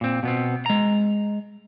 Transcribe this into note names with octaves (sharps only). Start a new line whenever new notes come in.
A#2 C4
B2 B3 C4
G#3 A#5